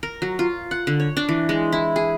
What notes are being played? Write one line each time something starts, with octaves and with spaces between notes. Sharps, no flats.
A#4
F#3
F4
F#5
D3
C#5
D4
E3
G#3
E4
G#4